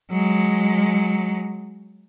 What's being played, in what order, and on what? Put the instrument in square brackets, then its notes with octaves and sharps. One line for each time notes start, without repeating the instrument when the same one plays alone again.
[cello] F#3 G#3